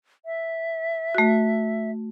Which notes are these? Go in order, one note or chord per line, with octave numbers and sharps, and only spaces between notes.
E5
A3 F#4